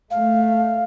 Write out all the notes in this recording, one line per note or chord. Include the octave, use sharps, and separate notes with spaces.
A3 F5